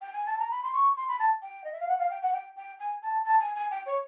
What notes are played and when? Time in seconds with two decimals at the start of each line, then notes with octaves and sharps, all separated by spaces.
0.00 G5
0.12 G#5
0.25 A5
0.38 A#5
0.50 B5
0.63 C6
0.73 C#6
0.96 C6
1.08 B5
1.18 A5
1.42 G5
1.64 D#5
1.72 E5
1.80 F5
1.87 F#5
1.98 F5
2.09 G5
2.22 F#5
2.32 G5
2.56 G5
2.79 G#5
3.02 A5
3.24 A5
3.39 G#5
3.55 G#5
3.70 G5
3.85 C#5